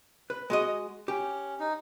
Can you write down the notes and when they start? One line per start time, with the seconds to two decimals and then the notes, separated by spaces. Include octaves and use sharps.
0.30 B4
0.50 G#3 F#4 D#5
1.08 C#4 G4
1.60 D#4